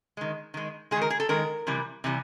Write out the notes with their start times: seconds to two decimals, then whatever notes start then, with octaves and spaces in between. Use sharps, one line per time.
0.17 D#3 G#3
0.54 D#3 G#3
0.91 G#3 G#4
0.96 D#3
1.01 A#4
1.10 G#4
1.20 A4
1.29 D#3 G#3 A#4
1.67 C3 E3 G3
2.04 C3 E3 G3